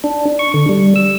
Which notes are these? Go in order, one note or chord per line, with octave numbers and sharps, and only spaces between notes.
D4
C#6
D3
G3
E6